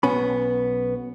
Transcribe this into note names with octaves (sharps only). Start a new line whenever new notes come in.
B1 B3 C#4 B5